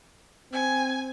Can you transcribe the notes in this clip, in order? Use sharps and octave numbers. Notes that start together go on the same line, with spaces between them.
C4 G#5